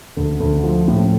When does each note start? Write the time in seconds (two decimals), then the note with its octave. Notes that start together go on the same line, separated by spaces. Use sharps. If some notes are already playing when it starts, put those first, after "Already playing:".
0.17 D2
0.40 D2
0.64 F3
0.88 A2